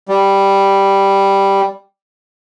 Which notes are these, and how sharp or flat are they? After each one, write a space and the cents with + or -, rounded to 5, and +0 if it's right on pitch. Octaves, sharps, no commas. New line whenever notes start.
G3 +0